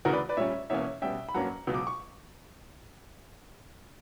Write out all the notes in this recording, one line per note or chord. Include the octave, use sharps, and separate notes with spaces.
D2 C#3 E3 F#4 A#4
B4 D5
B4 D5
A#2 G3 C#4 C#5 E5
E2 B2 A#3 C#4 C#5 E5
B2 G3 C#4 E5 G5
B5
G2 F#3 A#3 C#4 F#5 A#5
C#2 B2 F#3 B3
D6
C#6